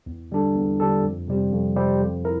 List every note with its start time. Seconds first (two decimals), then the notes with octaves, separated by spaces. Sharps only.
0.06 E2
0.31 D3 G3 D4 A4
0.55 E2
0.80 D3 G3 D4 A4
1.04 F2
1.28 C3 G3 C4 G4
1.53 F2
1.76 C3 G3 C4 G4
2.01 F2
2.24 E4 A#4